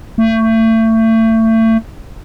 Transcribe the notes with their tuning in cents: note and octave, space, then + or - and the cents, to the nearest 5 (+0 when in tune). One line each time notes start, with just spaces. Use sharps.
A3 +30